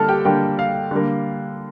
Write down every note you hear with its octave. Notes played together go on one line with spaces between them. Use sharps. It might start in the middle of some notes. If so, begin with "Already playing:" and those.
Already playing: D3 G3 A#3 A4 A5 F6
G4 G5
D3 G3 A#3 G4 G5
F5
D3 G3 A#3